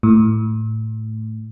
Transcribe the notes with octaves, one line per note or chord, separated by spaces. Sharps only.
A2